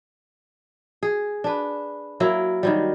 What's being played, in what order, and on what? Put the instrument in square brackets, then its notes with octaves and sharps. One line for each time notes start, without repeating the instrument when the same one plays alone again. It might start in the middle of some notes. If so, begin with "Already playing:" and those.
[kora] G#4
D4 B4
F#3 A#3 E4
D#3 F#3 G3